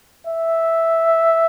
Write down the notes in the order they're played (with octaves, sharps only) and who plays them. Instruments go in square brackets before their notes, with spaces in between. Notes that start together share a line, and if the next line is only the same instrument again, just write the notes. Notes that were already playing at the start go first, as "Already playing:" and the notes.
[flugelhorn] E5